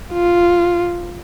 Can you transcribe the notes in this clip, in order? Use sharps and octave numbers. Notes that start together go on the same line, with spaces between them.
F4